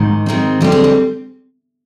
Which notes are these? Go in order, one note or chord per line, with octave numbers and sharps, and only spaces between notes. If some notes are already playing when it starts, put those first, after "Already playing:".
Already playing: G#2 D#3
G#2 D#3 G#3 C4
D3 G3 C4 G4
G#4
G4